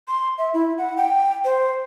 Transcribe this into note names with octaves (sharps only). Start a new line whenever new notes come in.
C6
E5
E4
F#5
G5
C5